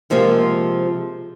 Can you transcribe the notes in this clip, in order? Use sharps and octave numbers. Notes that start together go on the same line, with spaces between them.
C3 F3 G#3 A#3 F4